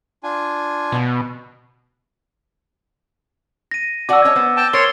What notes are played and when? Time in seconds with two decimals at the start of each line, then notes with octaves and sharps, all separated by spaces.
0.23 D4 F4 G#5
0.92 B2
3.71 A#6 D#7
4.09 F#4 D5 F#5 D6 E6
4.24 C#4 C#5 D#5
4.36 B3 C5
4.57 G5 A5
4.73 A#4 C5 C#5 C6 A6 D7 G7